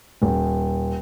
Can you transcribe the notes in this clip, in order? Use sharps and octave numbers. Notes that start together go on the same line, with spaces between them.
D#1